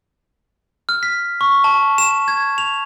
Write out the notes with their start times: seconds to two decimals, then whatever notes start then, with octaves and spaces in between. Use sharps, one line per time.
0.89 F6
1.03 B6
1.41 C#6
1.64 A5
1.98 E7
2.28 G#6
2.58 F7